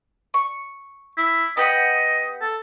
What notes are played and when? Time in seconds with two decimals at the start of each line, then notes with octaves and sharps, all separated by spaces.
0.34 C#6
1.18 E4
1.57 B3 G4 D#5 F#5
2.41 A4